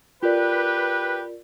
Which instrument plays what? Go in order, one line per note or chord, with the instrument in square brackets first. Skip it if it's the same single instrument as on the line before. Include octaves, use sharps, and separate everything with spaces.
[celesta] F4 A#4 D5 [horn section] G4 B4